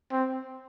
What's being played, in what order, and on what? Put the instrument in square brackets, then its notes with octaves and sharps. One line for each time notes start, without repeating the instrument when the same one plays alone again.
[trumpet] C4